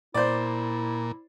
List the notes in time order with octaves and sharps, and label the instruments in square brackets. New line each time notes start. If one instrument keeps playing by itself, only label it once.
[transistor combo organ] A#2 [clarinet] E4 [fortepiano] C5 D5